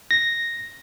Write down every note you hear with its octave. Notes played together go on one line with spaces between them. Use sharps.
A#6